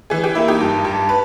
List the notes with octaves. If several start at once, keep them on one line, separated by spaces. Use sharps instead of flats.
E3 G#4
G4
A#3 E4
D#4 G4
G2
G2
B4